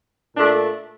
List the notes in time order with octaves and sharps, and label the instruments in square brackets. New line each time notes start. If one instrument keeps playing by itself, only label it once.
[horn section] A#2 A3 D4